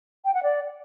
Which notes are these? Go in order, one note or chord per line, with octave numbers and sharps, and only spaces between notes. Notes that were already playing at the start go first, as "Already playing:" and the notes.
G5
F#5
D5